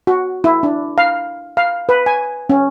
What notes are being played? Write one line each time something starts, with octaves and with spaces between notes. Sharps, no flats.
F#4
E4
D4
F5
F5
B4
G#5
C#4